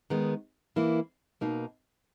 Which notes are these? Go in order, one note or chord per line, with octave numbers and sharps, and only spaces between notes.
D#3 G#3 B3
E3 A#3 E4
B2 A#3 D#4